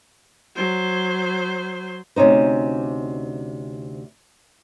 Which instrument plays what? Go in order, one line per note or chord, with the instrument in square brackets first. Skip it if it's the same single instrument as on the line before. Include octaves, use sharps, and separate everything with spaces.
[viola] F#3 C5
[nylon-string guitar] D2 C3 C#4 D#4 C5